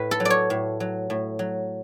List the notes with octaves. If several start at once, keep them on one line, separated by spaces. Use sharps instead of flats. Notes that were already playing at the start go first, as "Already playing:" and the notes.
Already playing: A2 B4
A4
F#3
D5
C#5
A2
F#3
A2
F#3